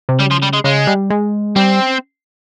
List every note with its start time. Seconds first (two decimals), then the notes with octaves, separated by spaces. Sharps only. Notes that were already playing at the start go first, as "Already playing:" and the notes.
0.09 C3
0.19 C#3 G3
0.31 F3
0.42 G3
0.53 G#3
0.64 C#3 G#3
0.87 G3
1.10 G#3
1.56 G3 C4